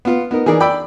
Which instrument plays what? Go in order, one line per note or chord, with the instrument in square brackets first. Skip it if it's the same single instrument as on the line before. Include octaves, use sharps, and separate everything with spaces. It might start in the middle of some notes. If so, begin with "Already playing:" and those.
[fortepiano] B3 F4
B3 D#4 A#4
E3 D#4 G#4 A#4 D5
D5 G5 B5 E6